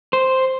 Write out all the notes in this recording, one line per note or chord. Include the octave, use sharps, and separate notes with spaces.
C5